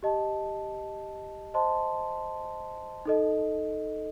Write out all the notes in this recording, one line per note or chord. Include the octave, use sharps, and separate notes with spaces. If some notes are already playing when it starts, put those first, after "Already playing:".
G4 D#5 A5
C5 D#5 A5 C6
D#4 A4 D#5